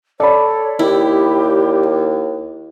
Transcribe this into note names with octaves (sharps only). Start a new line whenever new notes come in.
A4 C#5 D5 B5
D#2 E4 G4